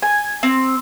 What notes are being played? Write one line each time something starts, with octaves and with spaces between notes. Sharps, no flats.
G#5
C4